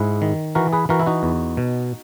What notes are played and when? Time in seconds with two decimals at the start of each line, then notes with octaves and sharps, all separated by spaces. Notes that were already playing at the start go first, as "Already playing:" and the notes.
Already playing: G#2 E4 G#4
0.22 D#3
0.55 E3 F#4 A#4
0.73 G#4 B4
0.89 E3 F#4 A#4
1.00 E4
1.06 D#4 F#4
1.23 E2
1.57 B2